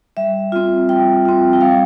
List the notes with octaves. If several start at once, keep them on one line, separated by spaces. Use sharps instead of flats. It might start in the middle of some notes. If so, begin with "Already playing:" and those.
G3 E5
C4 F4
G3 G5
C4 F4
G5
G3 F5